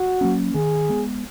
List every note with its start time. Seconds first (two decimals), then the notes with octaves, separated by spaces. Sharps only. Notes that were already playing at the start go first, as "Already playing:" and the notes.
Already playing: F#4
0.21 F#3 A#3 C#4
0.54 D#3 G#4
0.89 G#3 B3